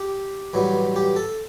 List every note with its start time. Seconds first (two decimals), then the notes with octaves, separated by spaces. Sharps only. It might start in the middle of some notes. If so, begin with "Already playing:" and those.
Already playing: G4
0.53 A1 G2 F#3 B3
0.96 G4
1.16 A4